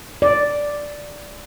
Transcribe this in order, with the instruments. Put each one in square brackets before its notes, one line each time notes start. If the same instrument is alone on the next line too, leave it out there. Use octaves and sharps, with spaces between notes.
[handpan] D5